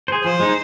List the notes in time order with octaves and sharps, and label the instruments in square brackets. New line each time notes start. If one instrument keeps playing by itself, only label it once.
[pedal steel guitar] G#4 C5
[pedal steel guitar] F3 [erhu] C5
[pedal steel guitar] G#3 D#4